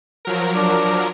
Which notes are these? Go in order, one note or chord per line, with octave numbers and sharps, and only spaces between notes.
F3 F#3 A#4
D4